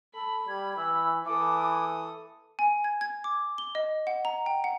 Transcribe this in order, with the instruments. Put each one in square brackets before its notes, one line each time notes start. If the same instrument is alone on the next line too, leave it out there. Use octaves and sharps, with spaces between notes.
[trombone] A4 [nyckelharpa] B5
[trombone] G3 [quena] G#6
[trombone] E3 [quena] E6
[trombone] E3 [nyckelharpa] A4 D#6 [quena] D6
[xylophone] G#5
G#6
G#6
D6
G7
D#5
F#5
A#5
G5
F#5